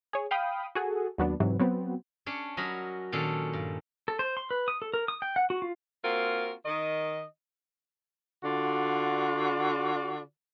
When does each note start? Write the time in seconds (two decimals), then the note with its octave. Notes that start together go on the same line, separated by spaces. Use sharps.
0.13 G#4 C#5
0.31 F5 G5 B5 D#6
0.75 F#4 G#4 A4
1.18 D#2 F#3 B3 D4
1.40 G#2 C3 E3 F#3
1.60 F#3 B3 C4
2.26 C#4 D4 C#5
2.57 F#3 C#4 F#4 A#4 D#5 B5
3.12 A#2 D#3 C#4 D4 A4
3.53 G2
4.08 A4
4.19 C5
4.37 C6
4.51 B4
4.68 D#6
4.82 A4
4.94 A#4
5.08 D#6
5.22 G5
5.36 F#5
5.50 F#4
5.62 F4
6.04 A#3 C4 F4 F#4 A#4
6.65 D#3 D#5
8.43 D3 F4 F#4 D5